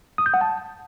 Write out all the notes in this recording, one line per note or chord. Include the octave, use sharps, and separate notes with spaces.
D#6
G6
F#5
A5